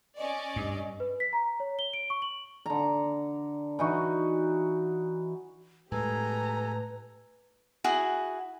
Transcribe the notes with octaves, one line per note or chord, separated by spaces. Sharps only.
C#4 D5 D#5
G2
B4
B6
A#5
C#5
G7
D7
C#6
F#7
D3 A#5
E3 D#4 F#4
A2 G#3 G4 A4 B4 G#5 A#5
E4 F#4 G#4 F#5